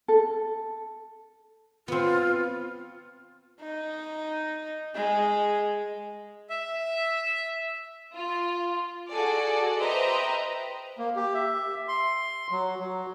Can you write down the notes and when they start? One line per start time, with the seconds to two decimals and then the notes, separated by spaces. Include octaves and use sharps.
0.08 A4
1.88 B3 C4 F4
3.60 D#4
4.95 G#3
6.49 E5
8.13 F4
9.09 F#4 G#4 A4 D5
9.78 B4 C5 D#5 E5 G5 A#5
10.98 A#3
11.16 G4
11.34 E5
11.88 C6
12.51 F#3
12.80 F#3